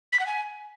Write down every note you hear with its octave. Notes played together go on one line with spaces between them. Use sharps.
B6
F#5
G#5